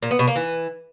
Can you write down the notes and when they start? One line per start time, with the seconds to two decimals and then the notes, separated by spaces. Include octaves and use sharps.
0.03 A#2
0.11 B3
0.19 B2
0.27 A#3
0.36 E3